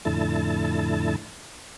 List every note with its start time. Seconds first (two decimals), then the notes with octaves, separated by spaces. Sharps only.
0.05 F2 A2 D3 E4 A5